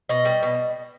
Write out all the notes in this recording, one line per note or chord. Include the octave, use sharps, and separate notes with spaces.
B2 D#5
G3
B2